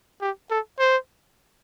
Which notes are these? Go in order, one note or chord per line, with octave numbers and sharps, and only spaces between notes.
G4
A4
C5